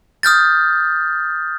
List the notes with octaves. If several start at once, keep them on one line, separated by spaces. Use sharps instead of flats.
D#6 F6 G6 A6